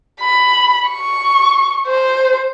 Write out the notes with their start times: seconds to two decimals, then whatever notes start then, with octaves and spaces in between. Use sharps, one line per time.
0.21 B5
0.89 C#6
1.87 C5